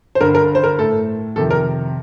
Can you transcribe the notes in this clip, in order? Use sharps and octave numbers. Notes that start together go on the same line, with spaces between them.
C5
G2 D3 A#4
A#4
C5
A#4
A2 A4
F2 C3 D#3 A4
A#4